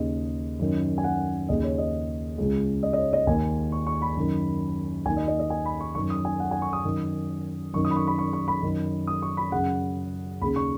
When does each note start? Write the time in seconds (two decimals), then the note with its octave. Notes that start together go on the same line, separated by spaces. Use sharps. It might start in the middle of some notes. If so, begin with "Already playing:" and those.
Already playing: D#2 C#3 D#5
0.59 F#2 D#3
0.98 G#5
1.04 F#5
1.49 D#2 C#3 D#5
1.64 C#5
1.78 D#5
2.38 C#2 C#3
2.83 D#5
2.93 D#5
2.98 C#5
3.13 D#5
3.27 D#2 D#3 G#5
3.72 C#6
3.87 C#6
4.02 B5
4.16 F#2 D#3
5.05 D#2 G#5
5.09 D#3
5.17 D#5
5.28 D#5
5.39 D#5
5.50 G#5
5.65 B5
5.80 C#6
5.95 F#2 D#3 C#6
6.10 D#6
6.25 G#5
6.40 F#5
6.51 G#5
6.62 C#6
6.73 D#6
6.84 F#2 D#3
7.74 F#2 D#3 C#6
7.85 D#6
7.91 B5
7.96 C#6
8.07 B5
8.18 C#6
8.33 C#6
8.48 B5
8.63 F#2 D#3
9.07 D#6
9.22 C#6
9.37 B5
9.52 F#2 C#3 F#5
10.41 D#2 C#3 B5
10.56 C#6